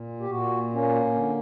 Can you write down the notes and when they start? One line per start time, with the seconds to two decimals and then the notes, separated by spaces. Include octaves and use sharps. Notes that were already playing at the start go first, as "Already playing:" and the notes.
Already playing: A#2
0.20 G4
0.30 A#2 F#4
0.73 A#3 C#4
1.14 D3